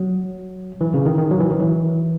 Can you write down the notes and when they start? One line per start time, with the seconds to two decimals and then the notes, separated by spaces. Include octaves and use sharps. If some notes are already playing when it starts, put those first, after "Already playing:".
Already playing: F#3
0.81 E3
0.94 C#3
1.06 D#3
1.18 D#3
1.31 F#3
1.40 E3
1.50 D#3
1.59 E3